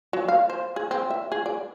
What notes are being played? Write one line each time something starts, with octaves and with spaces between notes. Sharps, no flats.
F#3
F5
C5
G#4
C4
E5
G#4
D5